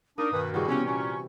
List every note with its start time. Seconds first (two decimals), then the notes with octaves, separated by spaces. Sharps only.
0.18 A#3 D4 D#4 A#4 D#6
0.32 G2 B2 D#3 B4
0.54 C#3 E3 G3 F#4 F#5
0.69 C3 E3 B3 C#4 G5
0.86 A#2 C#4 F#4 C#6